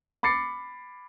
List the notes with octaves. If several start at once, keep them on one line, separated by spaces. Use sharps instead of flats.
B5 D6 A6 C7 C#7